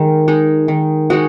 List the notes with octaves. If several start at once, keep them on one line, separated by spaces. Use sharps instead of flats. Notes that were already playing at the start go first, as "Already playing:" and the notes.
Already playing: D#3 G#3 D#4
G#3 D#4
D#3
G#3 D#4 F#4